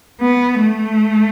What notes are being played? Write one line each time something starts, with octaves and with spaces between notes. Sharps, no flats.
B3
A3